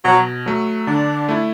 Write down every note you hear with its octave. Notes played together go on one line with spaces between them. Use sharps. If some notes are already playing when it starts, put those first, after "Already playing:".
B2 F#3
F#3 A3
D3 D4
A3 E4